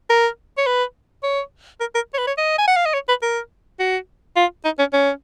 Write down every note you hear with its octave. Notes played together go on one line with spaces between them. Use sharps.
A#4
C#5
B4
C#5
A#4
A#4
C#5
B4
C#5
D#5
G#5
F#5
F5
D#5
C#5
B4
A#4
F#4
F4
D#4
C#4
C#4